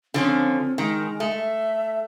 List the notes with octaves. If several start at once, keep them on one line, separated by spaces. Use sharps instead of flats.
D3 F3 C4 C#4
D#3 G#3
A3
E5